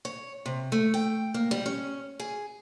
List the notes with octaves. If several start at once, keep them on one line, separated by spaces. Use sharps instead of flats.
C#5
C3
A3
G5
A#3
G3
C#4
G#4